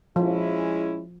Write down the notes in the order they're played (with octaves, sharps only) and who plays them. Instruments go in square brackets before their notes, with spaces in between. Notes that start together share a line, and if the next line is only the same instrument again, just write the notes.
[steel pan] F3 [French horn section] G#3 C#4 E4